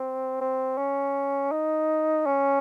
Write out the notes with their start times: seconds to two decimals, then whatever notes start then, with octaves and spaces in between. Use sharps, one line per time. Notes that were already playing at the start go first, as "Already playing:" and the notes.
Already playing: C4
0.41 C4
0.78 C#4
1.52 D#4
2.26 C#4